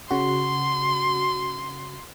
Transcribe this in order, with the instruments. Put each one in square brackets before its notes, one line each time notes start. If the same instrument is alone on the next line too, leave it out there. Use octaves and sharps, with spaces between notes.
[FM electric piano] C#3 F#4 [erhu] C6